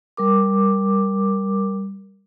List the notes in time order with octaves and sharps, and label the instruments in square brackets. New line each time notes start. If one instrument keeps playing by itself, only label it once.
[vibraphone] G3 A#4 D6